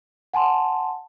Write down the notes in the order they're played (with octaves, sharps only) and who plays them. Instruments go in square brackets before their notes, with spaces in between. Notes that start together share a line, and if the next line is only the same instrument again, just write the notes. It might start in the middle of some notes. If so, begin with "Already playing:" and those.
[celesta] F#5 G#5 A5 C6